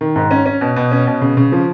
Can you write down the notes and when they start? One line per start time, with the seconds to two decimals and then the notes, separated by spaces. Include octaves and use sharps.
0.01 D#3
0.16 G#2
0.31 C#4
0.46 C#4
0.61 B2
0.76 B2
0.91 C#4
1.07 B2
1.21 C#3
1.37 C#3
1.52 F3